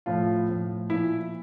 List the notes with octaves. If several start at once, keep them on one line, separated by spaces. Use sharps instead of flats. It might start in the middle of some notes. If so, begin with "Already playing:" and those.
A2 F3 F4
A2 F3
A#2 F3 E4